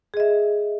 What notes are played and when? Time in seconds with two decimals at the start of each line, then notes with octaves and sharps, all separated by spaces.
0.14 G#4
0.17 D#5
0.20 E5